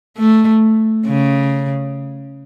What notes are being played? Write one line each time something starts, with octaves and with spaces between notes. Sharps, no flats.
A3
C#3